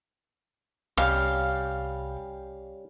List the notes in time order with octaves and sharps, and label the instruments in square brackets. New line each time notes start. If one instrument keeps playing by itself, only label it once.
[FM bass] C2 [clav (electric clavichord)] G3 C#4 [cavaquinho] F5